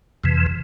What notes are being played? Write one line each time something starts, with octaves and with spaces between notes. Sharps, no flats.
F2 C3 E3